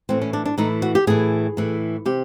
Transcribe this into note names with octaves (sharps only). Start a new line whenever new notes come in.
A2 E3 C4
C#4
D4
D4
A2 E3 D#4
F#4
G4
A2 E3 G#4
A2 E3
C3 G4